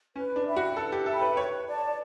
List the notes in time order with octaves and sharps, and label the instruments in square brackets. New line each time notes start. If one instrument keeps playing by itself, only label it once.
[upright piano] C#4 [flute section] B4
[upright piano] D4
[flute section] E5 G5 B5
[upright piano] F#4
[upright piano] A4 [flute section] B4
[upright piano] G4
[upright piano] A4 [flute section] E5 G5 B5
[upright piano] B4
[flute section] B4 [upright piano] C#5
[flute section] D5 A5